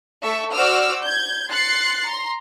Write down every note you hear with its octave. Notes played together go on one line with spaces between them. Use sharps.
A3 A4 E5 C#6
F#4 C5 D5 D6 E6 F6
G6 G#6
C6 F#6 A6 C7 C#7
A#5 C6